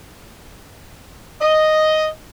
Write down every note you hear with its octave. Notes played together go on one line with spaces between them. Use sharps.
D#5